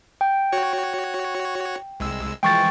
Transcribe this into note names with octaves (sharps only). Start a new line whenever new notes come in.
G5
F#4 C#5
C2 G#3 E6
E3 F3 G#3 G5 C#6 A6